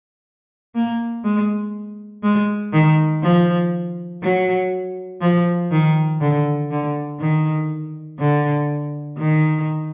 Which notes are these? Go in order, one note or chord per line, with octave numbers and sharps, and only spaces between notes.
A#3
G#3
G#3
D#3
F3
F#3
F3
D#3
D3
D3
D#3
D3
D#3